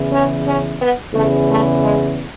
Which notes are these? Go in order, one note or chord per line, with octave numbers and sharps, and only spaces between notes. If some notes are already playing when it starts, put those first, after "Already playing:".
Already playing: E2 C#3 E3
C#4
C#4
B3
E2 C#3 E3 A3
A3
G#3